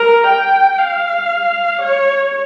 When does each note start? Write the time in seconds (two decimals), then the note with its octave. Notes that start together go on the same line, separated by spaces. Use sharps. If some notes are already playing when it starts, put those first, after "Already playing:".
Already playing: A#4
0.28 G5
0.79 F5
1.82 C#5